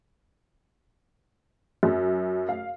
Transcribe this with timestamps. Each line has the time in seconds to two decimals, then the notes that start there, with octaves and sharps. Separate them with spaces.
1.83 F#2
2.49 F5